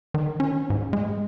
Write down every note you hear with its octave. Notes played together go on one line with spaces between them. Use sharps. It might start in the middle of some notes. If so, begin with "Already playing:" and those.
D#3
C#4
G#2
G#3